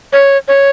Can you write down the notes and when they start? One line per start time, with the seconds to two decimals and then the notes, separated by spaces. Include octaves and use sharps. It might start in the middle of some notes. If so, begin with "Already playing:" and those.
0.13 C#5
0.48 C#5